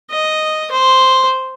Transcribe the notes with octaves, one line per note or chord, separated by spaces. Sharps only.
D#5
C5